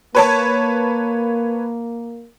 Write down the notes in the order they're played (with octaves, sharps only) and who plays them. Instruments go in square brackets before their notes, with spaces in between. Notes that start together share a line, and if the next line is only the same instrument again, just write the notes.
[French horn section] A#3 [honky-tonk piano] B4 C#5 A5